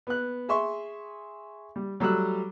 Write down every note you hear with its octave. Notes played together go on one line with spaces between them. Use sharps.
B3 F#6
G#4 E5 C6 C#6
G3
F#3 G3 A3 E6 F#6